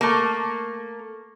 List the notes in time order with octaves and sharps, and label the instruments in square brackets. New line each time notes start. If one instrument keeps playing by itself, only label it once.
[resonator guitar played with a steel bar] A3 A#3